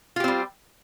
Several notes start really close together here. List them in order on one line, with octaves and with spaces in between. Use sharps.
F4 G4 C4 G3